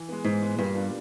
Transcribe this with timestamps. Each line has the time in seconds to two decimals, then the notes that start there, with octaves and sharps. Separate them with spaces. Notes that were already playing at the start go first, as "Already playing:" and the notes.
Already playing: E3
0.09 G#3 B3
0.24 G#2 E3
0.42 G#3 B3
0.58 G2 A#2
0.75 G3 B3 D4 F4